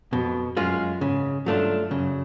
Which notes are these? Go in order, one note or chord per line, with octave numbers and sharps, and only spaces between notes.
F2 B2
F#2 G#3 C#4 F4
G#2 C#3
G2 F#3 A3 D4 F4
F#2 C#3